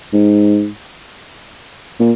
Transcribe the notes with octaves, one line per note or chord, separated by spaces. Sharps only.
G#2
A#2